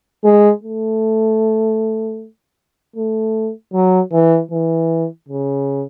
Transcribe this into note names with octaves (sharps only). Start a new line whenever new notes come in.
G#3
A3
A3
F#3
E3
E3
C#3